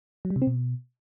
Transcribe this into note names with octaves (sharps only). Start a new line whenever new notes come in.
F#3
G3
C3
C4
B2